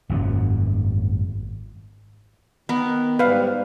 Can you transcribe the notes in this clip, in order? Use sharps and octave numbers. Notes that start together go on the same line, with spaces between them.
G#1 F#2 A#2
D#3 B3 A#4
G#2 G3 B4 F5